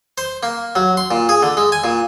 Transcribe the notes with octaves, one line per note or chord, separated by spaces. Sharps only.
C5
A#3
F#3
C6
A#2
G#4
D3
G#3
G#5
A#2